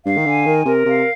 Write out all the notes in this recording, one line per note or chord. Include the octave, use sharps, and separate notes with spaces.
G2 F5
D#3
D3 G#5
D#3 A#4
C3 A#4
C3 F5